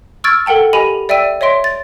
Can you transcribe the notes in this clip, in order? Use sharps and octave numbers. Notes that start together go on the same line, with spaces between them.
C#6 E6 F6 G#6 A6 D7
A4 A#4 F#5 G5 A5
G4 D#5 G#5 B5 D#7 F7
D5 E5 G5 E6 D#7
C#5 D#5 E5 C6 D7
A6